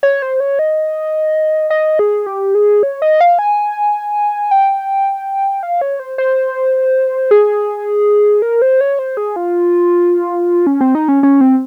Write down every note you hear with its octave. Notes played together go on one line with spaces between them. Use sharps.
C#5
C5
C#5
D#5
D#5
G#4
G4
G#4
C#5
D#5
F5
G#5
G5
F5
C#5
C5
C5
G#4
A#4
C5
C#5
C5
G#4
F4
C#4
C4
D#4
C#4
C#4
C4